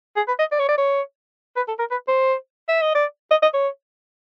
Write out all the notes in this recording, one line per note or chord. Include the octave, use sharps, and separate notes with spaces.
G#4
B4
D#5
D5
C#5
D5
C#5
B4
A4
A#4
B4
C5
E5
D#5
D5
D#5
D#5
C#5